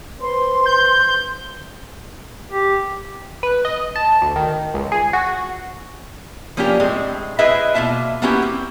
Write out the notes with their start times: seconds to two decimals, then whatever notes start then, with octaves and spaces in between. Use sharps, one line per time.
0.21 B4 C5 C6
0.66 G6
2.52 G4
3.43 B4
3.65 D#5
3.96 A5
4.22 D2
4.36 D#3
4.74 C#2
4.92 G#4
5.13 F#4
6.57 F3 A#3 C#4 D4 F4 G4
6.80 A2 G#3 C4
7.39 E4 G#4 B4 C5 D#5 E5
7.74 B2 A#3 F4 E5 A5
8.22 A#3 B3 C#4 E4 F#4 G4
8.42 C4